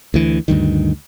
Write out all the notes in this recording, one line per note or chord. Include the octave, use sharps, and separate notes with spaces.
D2 E3
D2 G2 D#3